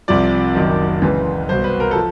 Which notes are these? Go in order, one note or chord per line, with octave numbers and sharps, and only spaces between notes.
C2 C3 F3 D5
F#1 F#2 D#3
C#2 C#3 E3
C2 B2 C5
B4
A#4
F3 A4